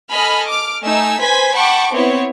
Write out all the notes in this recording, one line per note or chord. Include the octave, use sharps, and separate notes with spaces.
A4 D#5 G#5 B5 F6
D6 F6
A3 D#4 G#5 E6
B4 C5 G#5 G#6 B6
F#5 G5 A5 B5 C#6 D6
B3 C4 E4 C#5